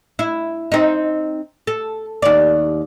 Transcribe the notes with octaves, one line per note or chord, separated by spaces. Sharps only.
E4
C4 D#4
A4
D#2 D5